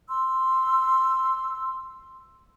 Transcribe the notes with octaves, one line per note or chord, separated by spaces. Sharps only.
C6 E6